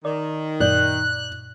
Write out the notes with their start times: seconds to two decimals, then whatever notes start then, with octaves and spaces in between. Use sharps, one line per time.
0.05 D#3 D5
0.60 F#2 A#2 D5 F#6 G6